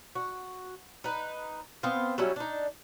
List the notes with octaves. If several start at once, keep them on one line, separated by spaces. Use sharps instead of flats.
F#4
D#4 B4
B3 C4 C5 F5
F#3 G3 C#4 E4
D4 D#4